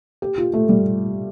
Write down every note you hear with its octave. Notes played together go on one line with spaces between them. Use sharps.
G4
F4
A3
G3